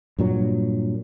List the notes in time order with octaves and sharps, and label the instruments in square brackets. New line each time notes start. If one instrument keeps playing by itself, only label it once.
[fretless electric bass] G2 A#2 F#3